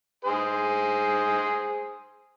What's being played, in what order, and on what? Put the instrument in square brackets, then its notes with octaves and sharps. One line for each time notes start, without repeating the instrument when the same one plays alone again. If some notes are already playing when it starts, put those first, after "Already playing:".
[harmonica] G#4 C5